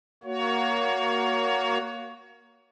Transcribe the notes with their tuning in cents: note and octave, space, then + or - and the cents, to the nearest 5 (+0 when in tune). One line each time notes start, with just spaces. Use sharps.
A#3 +0 F#4 +0 C#5 +25